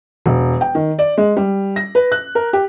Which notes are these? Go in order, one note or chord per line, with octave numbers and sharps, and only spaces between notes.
E1
G5
D#3
D5
G#3
G3
A#6
B4
F#6
A#4
G4